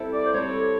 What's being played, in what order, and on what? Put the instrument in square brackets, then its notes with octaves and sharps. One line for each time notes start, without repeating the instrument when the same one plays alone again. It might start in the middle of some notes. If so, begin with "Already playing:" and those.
Already playing: [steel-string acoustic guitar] G3 C4 E4 A4
[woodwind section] D5
C5
[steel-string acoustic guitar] G3 C4 E4 A4 [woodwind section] C#5